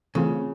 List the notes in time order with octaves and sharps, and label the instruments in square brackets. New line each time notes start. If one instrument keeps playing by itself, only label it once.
[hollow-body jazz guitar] C#3 [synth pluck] E3 A3 C4 F4